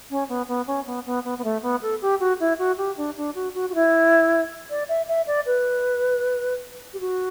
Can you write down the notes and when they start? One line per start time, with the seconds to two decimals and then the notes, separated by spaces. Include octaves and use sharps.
0.10 C#4
0.28 B3
0.48 B3
0.66 C#4
0.86 B3
1.06 B3
1.24 B3
1.38 B3
1.44 A3
1.62 B3
1.81 A4
2.01 G4
2.19 F#4
2.39 E4
2.58 F#4
2.77 G4
2.97 D4
3.16 D4
3.35 F#4
3.54 F#4
3.69 F#4
3.74 E4
4.70 D5
4.88 E5
5.08 E5
5.27 D5
5.46 B4
6.93 G4
6.99 F#4